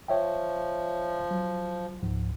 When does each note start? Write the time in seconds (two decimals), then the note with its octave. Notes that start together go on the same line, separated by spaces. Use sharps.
0.08 F3 C#5 E5 G5
1.31 F#3
2.03 C#2 G#2 F3